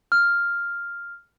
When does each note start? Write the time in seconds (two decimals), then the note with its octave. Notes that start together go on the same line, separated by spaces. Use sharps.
0.12 F6